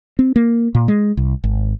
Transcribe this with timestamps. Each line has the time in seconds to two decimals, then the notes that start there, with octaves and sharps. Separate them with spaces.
0.19 C4
0.36 A#3
0.75 A#2
0.88 G#3
1.17 C2
1.44 G#1